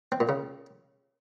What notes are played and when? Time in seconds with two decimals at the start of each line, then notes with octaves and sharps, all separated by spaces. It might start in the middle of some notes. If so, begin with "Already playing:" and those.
0.12 C4
0.20 A#2
0.29 C#3